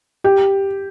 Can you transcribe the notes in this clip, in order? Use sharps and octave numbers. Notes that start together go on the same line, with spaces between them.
G4